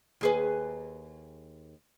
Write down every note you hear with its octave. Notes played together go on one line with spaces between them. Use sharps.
D#2 G#4 B4